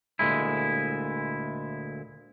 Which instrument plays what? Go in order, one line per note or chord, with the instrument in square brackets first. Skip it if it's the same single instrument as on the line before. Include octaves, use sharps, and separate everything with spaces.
[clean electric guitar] D2 A#2 G#3 E4